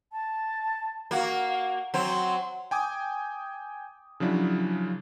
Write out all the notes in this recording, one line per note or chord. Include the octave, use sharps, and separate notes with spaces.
A5
A#3 F#4 F5
F#3 C4 C6
G5 G#5 D6 D#6
C#3 F3 F#3 D4 E4